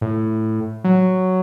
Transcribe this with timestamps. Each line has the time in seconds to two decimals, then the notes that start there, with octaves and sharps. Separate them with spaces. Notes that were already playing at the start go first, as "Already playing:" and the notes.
0.01 A2
0.84 F#3